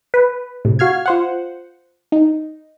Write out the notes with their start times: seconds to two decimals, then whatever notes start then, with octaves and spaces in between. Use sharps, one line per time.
0.14 B4
0.65 A2 C3
0.79 F#4 F5 F6 G#6
1.06 F4 C5 F#5
2.12 D#4